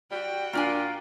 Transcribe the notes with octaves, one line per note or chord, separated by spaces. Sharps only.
G3 F#4 G5
A#2 A#3 D4 F4 G#5